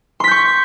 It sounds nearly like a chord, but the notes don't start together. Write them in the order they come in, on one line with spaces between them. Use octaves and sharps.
C6 B6 G6 C#6